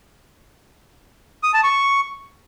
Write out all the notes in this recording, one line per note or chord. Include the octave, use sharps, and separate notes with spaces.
D#6
A5
C#6